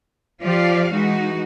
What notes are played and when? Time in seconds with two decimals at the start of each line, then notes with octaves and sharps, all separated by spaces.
0.42 F3 F4 G4 D5 F5
0.90 E3 G#3 D#4 F#4